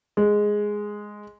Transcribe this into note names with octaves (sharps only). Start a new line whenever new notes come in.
G#3